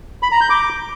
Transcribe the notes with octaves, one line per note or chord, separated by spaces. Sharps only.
B5
A#5
G6
D6